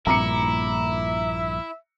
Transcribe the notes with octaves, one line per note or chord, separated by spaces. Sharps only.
A#1 G2 A#2 E4 E5 A#5 D6 C#7